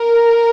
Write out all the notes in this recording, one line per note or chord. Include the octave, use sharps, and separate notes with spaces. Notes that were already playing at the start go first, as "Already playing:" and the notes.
Already playing: A#4